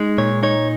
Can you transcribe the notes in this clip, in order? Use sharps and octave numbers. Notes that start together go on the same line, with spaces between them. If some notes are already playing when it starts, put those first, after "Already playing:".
Already playing: G#3 D#4
A#2 C#5
D#4 C#5